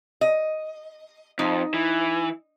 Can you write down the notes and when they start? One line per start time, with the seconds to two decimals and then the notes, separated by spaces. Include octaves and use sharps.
0.21 D#5
1.39 F2 D#4
1.74 E3